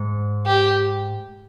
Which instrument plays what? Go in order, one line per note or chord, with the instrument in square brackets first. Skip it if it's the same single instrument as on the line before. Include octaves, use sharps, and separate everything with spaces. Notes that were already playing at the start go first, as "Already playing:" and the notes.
Already playing: [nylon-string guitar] G#2
[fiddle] G4